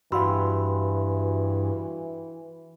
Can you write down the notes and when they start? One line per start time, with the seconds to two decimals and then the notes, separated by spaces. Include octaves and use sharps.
0.12 G2 E3 F#4 F5 G5 B5 C6 E6